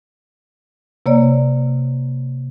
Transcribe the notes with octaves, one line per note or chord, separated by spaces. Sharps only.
C3 A#3 C#5 D5